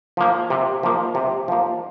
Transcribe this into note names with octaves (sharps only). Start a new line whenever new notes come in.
F3 A#3
C3
F3 A#3
C3
F3 A#3